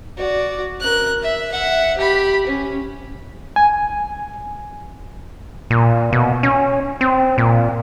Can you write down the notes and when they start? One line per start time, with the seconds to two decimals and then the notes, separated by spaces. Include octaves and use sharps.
0.18 F#4 D5
0.80 A#4 F#6
1.22 E5
1.52 E5 F#5
1.98 G4 B5
2.47 C#4
3.56 G#5
5.70 A#2
6.13 B2
6.43 C#4
7.01 C4
7.38 A#2